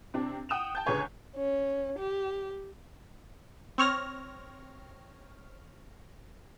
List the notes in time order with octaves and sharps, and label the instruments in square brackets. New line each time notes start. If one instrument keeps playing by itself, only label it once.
[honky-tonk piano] C3 C4 D4
F#5 G5 D#6 E7 F7
G5 A5 G6
C#2 D3 G#4 B4 C#5 G#5
[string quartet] C#4
G4
[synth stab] C4 C#5 F6 A#6